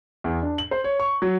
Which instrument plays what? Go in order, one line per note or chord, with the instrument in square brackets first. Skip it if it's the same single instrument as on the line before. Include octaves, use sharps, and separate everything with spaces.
[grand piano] E2
D4
F#7
C5
C#5
C#6
F#3